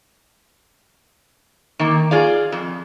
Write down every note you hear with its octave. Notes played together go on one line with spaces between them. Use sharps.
D#3 A#3
F4 G#4 D5 F5
F2